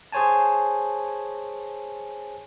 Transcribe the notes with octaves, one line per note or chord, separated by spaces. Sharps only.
G#4 C5 C#5 G#5 A5